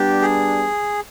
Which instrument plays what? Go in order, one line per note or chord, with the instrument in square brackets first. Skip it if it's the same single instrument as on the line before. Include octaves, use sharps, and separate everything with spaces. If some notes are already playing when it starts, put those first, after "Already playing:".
Already playing: [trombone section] G3 B3 D4 [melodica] G4
[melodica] G#4